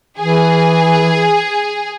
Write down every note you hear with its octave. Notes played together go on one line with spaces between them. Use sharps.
E3 G#4